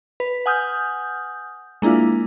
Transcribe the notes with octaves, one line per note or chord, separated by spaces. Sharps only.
B4
F#5 G#5 D#6 F6 G6
G#3 A#3 D4 E4 F4